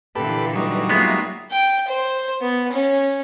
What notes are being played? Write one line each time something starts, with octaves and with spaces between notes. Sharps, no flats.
A#2 D3 E3 G4 A4 B4
F#3 G3 D#4
G#3 A#3 B3 F4 E5
G5
C5
B3
C#4